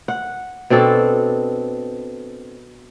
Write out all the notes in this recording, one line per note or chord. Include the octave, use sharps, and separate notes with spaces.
F#5
B2 C4 D4 A4